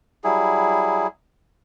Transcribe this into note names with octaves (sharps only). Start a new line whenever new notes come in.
F#3 G3 E4 G#4